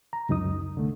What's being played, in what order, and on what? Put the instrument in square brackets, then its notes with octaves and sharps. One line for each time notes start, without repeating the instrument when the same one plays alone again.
[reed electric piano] A#5
C#2 F#2 D#4 D#6
C2 D3 A3